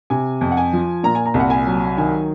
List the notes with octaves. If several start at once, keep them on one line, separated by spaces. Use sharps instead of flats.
C3 G#5
F2
F#5
G#5
F3
A#2 A#5
G#5
A#5
C2
F#5
G#5
F#3
D#3 G#5